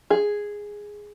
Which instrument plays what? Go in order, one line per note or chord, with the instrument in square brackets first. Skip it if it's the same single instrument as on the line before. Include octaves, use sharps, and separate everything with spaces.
[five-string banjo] G#4